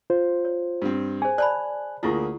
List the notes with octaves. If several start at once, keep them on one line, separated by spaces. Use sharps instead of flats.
F4 C5
C#5
G2 C4
G#4 C5 G#5
D5 A5 B5 F#6
D2 A#3 E4 F4 G#4 C#6